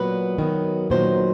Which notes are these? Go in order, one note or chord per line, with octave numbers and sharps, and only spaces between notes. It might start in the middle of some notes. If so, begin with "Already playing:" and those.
Already playing: A#2 F#3 B3 B4
D#3 F#3 B3
A#2 F#3 B3 D#4 C5